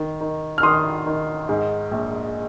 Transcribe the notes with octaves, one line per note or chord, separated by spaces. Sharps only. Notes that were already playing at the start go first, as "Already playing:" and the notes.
Already playing: D#3
D#3
F6
D#3 C6 D#6
D#3
G#2
A#1